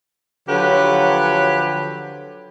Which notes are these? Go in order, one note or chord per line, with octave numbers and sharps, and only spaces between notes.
D3 F3 F#3 G4 B4 C#5